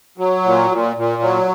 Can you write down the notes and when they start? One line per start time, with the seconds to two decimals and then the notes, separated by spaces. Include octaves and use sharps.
0.18 F#3
0.44 A#2
0.71 A#2
0.96 A#2
1.22 F#3